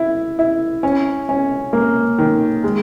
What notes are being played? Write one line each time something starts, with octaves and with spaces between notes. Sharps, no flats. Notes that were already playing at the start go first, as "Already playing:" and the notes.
Already playing: E4
E4
C#4
C#4
A#3
D#3
G#3